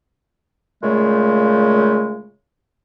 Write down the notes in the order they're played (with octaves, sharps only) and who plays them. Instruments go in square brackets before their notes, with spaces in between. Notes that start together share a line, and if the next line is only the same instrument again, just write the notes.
[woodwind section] A#2 C#3 G#3 A3